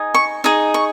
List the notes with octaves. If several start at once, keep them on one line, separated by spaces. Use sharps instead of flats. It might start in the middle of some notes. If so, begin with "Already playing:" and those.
Already playing: D#4 G#4
C#6
D#4 G#4
C#6